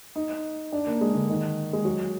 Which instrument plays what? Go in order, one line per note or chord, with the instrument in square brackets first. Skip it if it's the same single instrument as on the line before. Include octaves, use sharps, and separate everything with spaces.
[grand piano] D#4
D4
A#3
G#3
D3
D#3
G#3
F#3